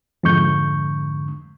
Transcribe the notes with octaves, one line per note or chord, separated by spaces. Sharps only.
F2 G#2 D3 C#6 G6